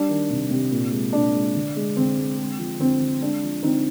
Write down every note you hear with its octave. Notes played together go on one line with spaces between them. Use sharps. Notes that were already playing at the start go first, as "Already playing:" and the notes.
Already playing: G3 D4
D#3
C3
C3
A#2
G#3
A#2 D4
G#3
D3
G#3
D3 C4
G#3
G#3
F3
D3 C4
D3
G#3 D4
F3
D3 C4 D#4